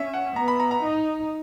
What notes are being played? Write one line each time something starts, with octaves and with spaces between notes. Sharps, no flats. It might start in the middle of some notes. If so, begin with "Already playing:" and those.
Already playing: C#4 E5
F#5
B3 A#5
B5
A#5
A#5
D#4